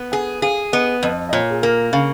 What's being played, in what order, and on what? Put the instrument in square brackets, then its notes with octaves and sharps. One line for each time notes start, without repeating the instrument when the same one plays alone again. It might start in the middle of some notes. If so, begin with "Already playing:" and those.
Already playing: [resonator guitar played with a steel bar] B3
[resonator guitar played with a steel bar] G#4 [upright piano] F#5
[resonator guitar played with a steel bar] G#4 [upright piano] F5
[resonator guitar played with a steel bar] B3 [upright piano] D#5
[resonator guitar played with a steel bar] F2 [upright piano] D#5
[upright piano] D#5
[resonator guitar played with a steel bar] A#2 [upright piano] C#5
[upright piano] G#4
[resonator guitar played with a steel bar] A#3 [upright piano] A#4
[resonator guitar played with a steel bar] C#3 [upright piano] F5